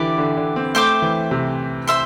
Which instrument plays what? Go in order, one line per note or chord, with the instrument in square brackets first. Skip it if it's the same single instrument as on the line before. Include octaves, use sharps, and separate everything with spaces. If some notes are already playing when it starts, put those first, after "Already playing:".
Already playing: [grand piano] D3 E3 [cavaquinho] E4 G4 D5
[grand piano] D3
D3
C4
[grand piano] A3 [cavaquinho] C5 E5 G5 D6
[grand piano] E3
C3
[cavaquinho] C5 E5 C6